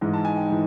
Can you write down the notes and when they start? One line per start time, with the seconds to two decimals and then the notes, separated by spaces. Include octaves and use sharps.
0.01 G#2 E3 G#3
0.14 A5
0.25 G#5
0.36 G5
0.49 E3 G#3